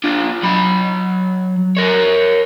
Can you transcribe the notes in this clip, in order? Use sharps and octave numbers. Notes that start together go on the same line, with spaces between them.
D4 F4
F#3 B5
A#4 C#5